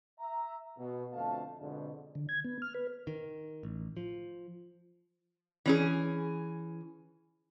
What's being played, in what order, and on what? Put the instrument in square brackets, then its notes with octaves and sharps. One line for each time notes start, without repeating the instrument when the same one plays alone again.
[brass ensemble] E5 A#5
B2
F2 B2 D3 A3 F5 A5
F2 G#2 B2 D3
[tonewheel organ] D3
G#6
B3
F6
B4
[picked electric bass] D#3
A1
F3
[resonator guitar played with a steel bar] E3 C#4 G#4